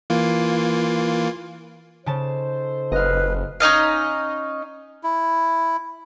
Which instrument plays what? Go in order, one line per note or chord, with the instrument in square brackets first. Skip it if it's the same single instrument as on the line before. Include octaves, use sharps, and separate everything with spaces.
[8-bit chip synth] E3 A#3 F4
[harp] C#3 A5 [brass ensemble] D#4 A4 C5
[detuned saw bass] F#1 [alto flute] B4 [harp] D#5 F5
[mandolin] C#4 D#4 D#5 F5
[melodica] E4